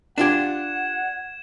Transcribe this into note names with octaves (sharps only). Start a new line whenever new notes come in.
D4 F4 G4 F#5 G#6 E7